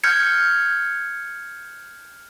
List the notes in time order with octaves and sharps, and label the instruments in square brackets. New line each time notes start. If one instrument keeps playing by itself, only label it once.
[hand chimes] F6 G6 G#6 C#7